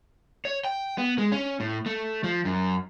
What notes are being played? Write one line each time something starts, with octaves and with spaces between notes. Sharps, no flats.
C#5
G5
B3
G#3
C#4
A2
A3
F3
F#2